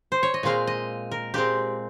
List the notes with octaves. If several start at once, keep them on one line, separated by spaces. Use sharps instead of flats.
C5
C#5
D#5
A#2 G#3 C4 F5
D#5
A#4
A#2 G#3 C4 G4